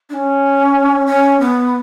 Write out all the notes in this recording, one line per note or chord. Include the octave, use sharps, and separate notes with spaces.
D4
C#4
C#4
B3